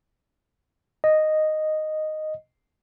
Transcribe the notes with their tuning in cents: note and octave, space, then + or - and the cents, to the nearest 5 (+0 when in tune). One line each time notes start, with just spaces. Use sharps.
D#5 -5